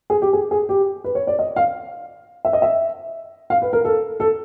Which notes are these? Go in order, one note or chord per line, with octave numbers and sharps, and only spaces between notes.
G#4
G4
G#4
G#4
G4
B4
C#5
D5
D#5
F5
E5
D#5
E5
F5
B4
A#4
A4
A4